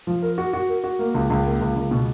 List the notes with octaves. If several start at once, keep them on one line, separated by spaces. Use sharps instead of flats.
F3
A#4
F#4
F#4
A#4
F#4
A#3
C#2
C#2
A#3
C#2
C#2
B2